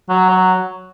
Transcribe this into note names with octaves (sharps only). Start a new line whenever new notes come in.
F#3
F#3